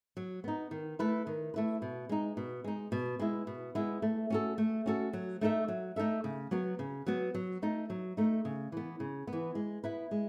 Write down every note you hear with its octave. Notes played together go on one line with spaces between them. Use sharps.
F#3
B3 D#4
D#3
A3 E4 B4
D#3
A3 E4 B4
B2
G#3 D#4
B2
G#3 D#4
B2
G#3 B3 E4
B2
G#3 B3 E4
A3
C#4 F#4 A4
A3
C#4 F#4 A4
F#3
A3 D#4 A4 E5
F#3
A3 D#4 A4 E5
C#3
F#3 B3 F#4
C#3
F#3 B3 F#4
F#3
A3 D#4
F#3
A3 D#4
C#3
E3 B3
C#3
B3
E3
G#3
B3 E4 B4
G#3